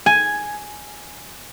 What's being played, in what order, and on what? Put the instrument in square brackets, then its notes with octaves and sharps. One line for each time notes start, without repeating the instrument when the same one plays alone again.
[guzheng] G#5